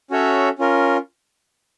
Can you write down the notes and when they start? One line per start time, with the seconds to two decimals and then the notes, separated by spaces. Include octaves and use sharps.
0.11 C#4 F#4 A4 C#5 E5
0.59 C#4 F4 A#4